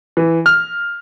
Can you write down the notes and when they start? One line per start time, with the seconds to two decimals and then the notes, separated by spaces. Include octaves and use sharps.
0.17 E3
0.46 F6